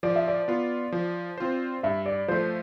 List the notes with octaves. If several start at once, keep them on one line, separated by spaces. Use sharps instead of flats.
F3 D5
E5
D5
B3 F4
F3
C4 F4 C5
G2 E5
D5
F3 A3 C5